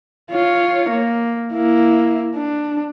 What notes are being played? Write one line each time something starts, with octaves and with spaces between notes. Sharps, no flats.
F4 C#5
A#3
A#3 E4
D4